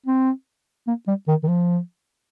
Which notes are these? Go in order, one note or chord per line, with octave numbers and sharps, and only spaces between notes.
C4
A#3
G3
D#3
D#3
F3